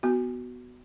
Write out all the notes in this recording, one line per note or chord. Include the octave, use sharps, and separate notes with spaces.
B3 F#4